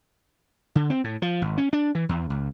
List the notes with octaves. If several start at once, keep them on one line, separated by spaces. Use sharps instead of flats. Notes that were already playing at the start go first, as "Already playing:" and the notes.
D3
C4
A2
F3
G#1
C#4
D4
E3
E2
C#2